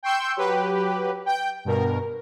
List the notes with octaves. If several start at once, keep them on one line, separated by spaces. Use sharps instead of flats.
G5 C6 C#6 E6 G6
F#3 G4 B4
G5 G6
G2 B2 A#4